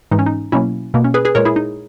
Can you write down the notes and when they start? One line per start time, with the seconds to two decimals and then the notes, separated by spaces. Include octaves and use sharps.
0.11 G#2 E3 G#3 D#4
0.19 C#4
0.26 D#4
0.52 B2 F#3 A#3 C#4 E4
0.94 B2 A#3
1.04 C#4
1.14 G#4 B4
1.25 G#4 B4
1.35 A#2 G#3 A#4 C#5
1.45 E4 G#4
1.56 D#4